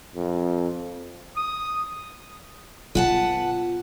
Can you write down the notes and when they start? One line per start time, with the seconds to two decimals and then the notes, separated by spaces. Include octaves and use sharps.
0.15 F2
1.36 D#6
2.95 B2 F4 B4 F#5 A5